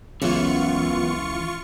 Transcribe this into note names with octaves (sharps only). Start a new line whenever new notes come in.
C#2 F#2 C#3 E3 B3 F4 C#6 C#7